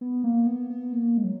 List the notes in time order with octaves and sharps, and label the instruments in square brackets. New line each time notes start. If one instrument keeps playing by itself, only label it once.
[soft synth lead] B3
A#3
B3
B3
A#3
G#3
F#3